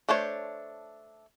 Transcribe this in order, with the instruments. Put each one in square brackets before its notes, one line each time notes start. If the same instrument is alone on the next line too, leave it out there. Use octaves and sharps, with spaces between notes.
[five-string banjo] A3 D4 C5 C#5